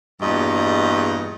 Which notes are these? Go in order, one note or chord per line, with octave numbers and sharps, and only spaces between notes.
E2 G2 A#2 F#4 G#4 D#5